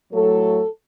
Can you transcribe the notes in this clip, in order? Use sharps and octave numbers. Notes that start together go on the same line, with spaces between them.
A2 F#3 A3 A4